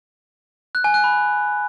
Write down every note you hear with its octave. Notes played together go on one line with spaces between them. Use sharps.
F#6
G#5
F#6
B5